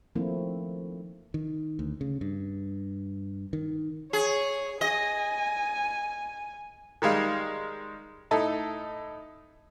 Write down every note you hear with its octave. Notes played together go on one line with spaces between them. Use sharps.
D#3 F3 A3 A#3 C4 E4
D#3
D2
C#3
G2
D#3
G#4 C#5
D#5 G#5
D#3 G3 G#3 F5
A2 D#4 A4